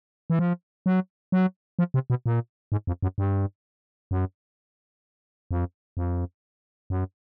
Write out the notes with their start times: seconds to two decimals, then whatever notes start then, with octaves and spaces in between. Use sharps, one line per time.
0.30 E3
0.39 F3
0.86 F#3
1.32 F#3
1.79 F3
1.94 C3
2.10 B2
2.26 A#2
2.72 G#2
2.87 F2
3.03 F#2
3.18 G2
4.11 F#2
5.51 F2
5.97 F2
6.90 F#2